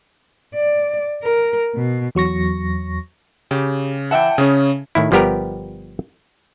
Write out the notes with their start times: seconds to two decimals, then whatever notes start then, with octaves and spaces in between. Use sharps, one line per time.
0.54 D5
1.23 A#4
1.75 B2
2.15 E2 F#3 C#6 A#6
3.51 C#3 G4
4.11 E3 E5 F#5 G5 A5
4.38 C#3 C#4 G#4
4.95 A2 D#3 E4
5.11 G1 F3 G3 B3 G4 A#4